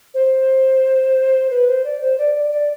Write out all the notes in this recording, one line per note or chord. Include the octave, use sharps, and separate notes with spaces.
C5
B4
C5
D5
C5
D5
D5
D5